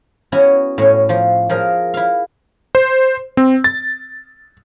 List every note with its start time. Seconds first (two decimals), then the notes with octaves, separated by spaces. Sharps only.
0.32 B3 C#4 E4 F#4
0.78 A2 C#4
1.09 F3
1.49 F3 G#4 A#4
1.94 E4 F5
2.75 C5
3.37 C4
3.64 A6